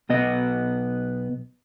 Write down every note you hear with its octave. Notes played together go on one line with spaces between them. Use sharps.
B1 B3 D#5